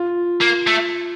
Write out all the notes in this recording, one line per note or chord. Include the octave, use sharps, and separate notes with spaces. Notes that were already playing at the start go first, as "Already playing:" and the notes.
Already playing: F4
A#3
A3